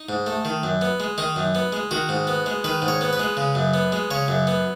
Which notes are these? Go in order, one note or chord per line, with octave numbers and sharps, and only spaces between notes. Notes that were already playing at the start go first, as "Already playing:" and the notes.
Already playing: D#4
G#2
A3
D#3
F#2
B3
G#3
D#3 D#4
F#2
B3
G#3
D#3 F#4
G#2
B3
G#3
D#3 B4
G#2
C#5
B3
B4
G#3
C#3
F#2
B3
G#3
C#3 C#5
F#2
B3